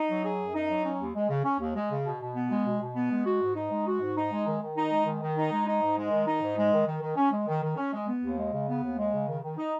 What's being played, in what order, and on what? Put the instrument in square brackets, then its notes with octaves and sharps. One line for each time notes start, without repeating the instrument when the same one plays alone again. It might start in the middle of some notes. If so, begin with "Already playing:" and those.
Already playing: [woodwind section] D#4
F#3
G#4
F#2
D#4
F#3
C#4
D#2
G#3
C#3
C#4
D#2
G#3
C#3
B2
B2
B3
G#3
B2
B2
B3
G#3
F#4
G#2
D#4
G#3
F#4
G#2
D#4
G#3
D#3
D#3
D#4
G#3
D#3
D#3
D#4
G#3
D#4
G#2
G#3
D#3
D#4
G#2
G#3
D#3
D#3
D#3
C#4
G#3
D#3
D#3
C#4
G#3
B3
D#2
G#3
C#3
B3
D#2
G#3
C#3
D#3
D#3
D#4